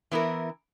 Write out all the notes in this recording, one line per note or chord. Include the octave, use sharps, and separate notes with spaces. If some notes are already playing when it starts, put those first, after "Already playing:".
E3 B3 E4 A#4